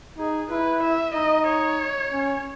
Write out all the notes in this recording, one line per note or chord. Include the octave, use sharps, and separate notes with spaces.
D#4 G#4
E4 B4
E5
D#4 D#5
C#5
C#4